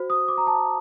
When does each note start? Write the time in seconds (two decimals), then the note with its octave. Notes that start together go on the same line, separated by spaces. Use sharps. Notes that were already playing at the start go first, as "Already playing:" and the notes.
Already playing: F#4 C5
0.10 D#6
0.28 D6
0.38 A#5
0.47 A5